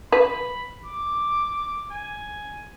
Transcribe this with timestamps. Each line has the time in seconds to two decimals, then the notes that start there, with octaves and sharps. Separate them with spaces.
0.12 B4 B5
0.85 D6
1.92 G#5